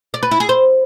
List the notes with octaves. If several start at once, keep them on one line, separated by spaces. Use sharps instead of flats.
D5
B4
E4
G#4
C5